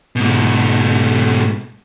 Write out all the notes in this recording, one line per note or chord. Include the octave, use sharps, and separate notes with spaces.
G#2 B2